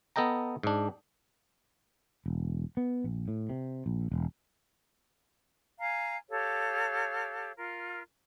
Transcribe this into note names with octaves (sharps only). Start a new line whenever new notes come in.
B3 A4 D#5 G5 A#5
G#2 D4
E1
B3
A#1
A2
C3
A#1
E1
F5 G#5 A#5
G4 A4 C#5 F5
F4 A#4